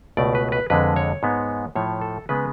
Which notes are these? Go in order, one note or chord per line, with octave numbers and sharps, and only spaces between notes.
C#2 B2 A3 D5
B4
B4
F2 D3 G#3 B4
C#5
G#2 G#3 B3
A2 F3 A3 C#5
A4
C#3 G#3 B3 B4